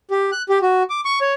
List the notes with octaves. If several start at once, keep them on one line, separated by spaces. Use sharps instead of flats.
G4
F#6
G4
F#4
D6
C#6
C#5